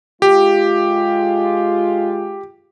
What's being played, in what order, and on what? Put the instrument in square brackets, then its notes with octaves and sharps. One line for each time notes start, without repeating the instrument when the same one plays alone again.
[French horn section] G#3 F4 [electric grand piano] G4